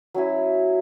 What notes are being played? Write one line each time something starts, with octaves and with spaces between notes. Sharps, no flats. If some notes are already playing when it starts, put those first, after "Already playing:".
F#3 C#4 E4